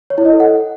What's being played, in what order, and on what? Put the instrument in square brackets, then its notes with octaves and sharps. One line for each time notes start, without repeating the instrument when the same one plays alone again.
[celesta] C#5
E4
D#5
A4
F#5